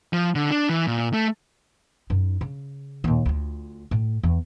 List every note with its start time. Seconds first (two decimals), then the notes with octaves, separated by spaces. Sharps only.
0.13 F3
0.35 D3
0.51 D4
0.69 E3
0.87 A#2
1.14 A3
2.10 F#2 D#4
2.41 C#3
3.04 D#2 A#2
3.25 D2 F4
3.91 A2
4.23 E2